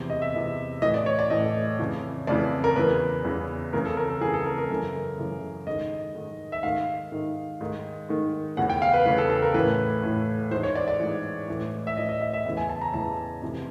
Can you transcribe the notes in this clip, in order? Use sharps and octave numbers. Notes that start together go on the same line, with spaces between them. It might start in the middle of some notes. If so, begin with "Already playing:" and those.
Already playing: E2 C3 E3
D#5
E5
E2 C3 E3
A2 E3 D#5
D5
C#5
D5
A2 E3 D#5
F2 C#3 E3
F2 C#3 E3 D5
A#4
E2 C#3 E3 B4
E2 C#3 E3
F2 C#3 E3 A#4
A4
A#4
A4
F2 C#3 E3 G#4
A4
A#4
A#4
F#2 C#3 E3
F#2 C#3 E3
G#2 D#3 D#5
G#2 D#3
E5
G#2 D#3 F5
G#2 D#3
G#2 D#3
G#2 D#3
E2 C#3 E3 F#5
G5
F5
B4
E2 C#3 E3 B4
A4
A4
A#4
A2 E3 B4
A2 E3
G#2 E3 C5
C#5
D5
D5
G#2 E3
A2 E3
E5
A2 E3 D#5
D#5
E5
E5
E2 C#3 E3 E5
G#5
A5
A#5
E2 C#3 E3 A5
F2 C3 E3